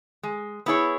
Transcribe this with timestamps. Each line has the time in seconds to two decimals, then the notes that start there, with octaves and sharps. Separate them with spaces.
0.23 G#3
0.66 B3 E4 G#4 C#5